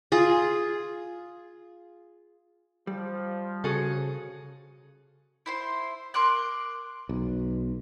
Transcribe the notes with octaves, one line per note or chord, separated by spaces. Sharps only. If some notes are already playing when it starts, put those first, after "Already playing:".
F4 G#4
F3 G3
C#3 F#4 G#4 A4
E4 C5 C6
A#4 C6 D6 F#6
B1